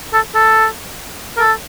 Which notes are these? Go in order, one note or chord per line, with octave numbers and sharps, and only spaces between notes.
A4
A4
A#4
A4